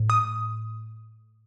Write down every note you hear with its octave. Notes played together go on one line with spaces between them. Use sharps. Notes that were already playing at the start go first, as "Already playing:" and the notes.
Already playing: A2
D#6